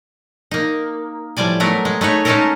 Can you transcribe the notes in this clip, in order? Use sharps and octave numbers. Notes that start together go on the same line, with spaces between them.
A#3 D#4
A2 F3 G3 D5 G#5
F#3 A3 B3 A#4
G#3
A3 D#4 B4 C#5
G#3 A3 C#4 D#4 A4 A#4